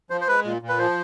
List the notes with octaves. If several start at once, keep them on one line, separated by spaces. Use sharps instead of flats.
F3 C5
C5
G#3 B4
A#2
A#2
B4
F3 C5